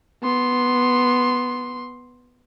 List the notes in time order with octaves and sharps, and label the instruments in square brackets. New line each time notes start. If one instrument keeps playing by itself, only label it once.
[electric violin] B3 C6